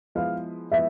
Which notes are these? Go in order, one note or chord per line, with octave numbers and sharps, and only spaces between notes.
F3 G#3 B3 E4 B4 F5
F3 G#3 B3 E4 B4 E5